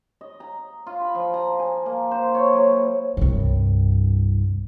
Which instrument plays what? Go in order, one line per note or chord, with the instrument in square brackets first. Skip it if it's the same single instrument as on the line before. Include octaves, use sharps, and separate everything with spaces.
[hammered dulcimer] D#5
A#5
F4
B5
F3
A#5
G#5
A#3
C5
C#5
F#3
E4
[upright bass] C2 G2